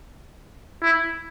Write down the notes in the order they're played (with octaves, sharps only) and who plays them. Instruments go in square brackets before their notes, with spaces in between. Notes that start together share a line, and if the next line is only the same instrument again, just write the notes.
[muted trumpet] E4